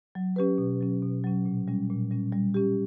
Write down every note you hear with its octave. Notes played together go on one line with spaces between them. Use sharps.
F#3
C#4 G4 B4
B2
F#3 C#4
B2
F#3 C#4
A#2
G3 C#4
A#2
G3 C#4
G3
C#4 G4